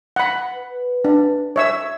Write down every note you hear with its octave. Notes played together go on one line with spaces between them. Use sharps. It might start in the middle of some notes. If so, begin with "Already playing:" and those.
F#5 B5
B4
D4
C#5 E5 E6